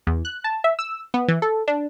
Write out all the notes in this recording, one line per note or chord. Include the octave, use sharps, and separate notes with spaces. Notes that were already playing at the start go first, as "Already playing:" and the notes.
E2
F#6
A5
E5
E6
B3
E3
A4
D4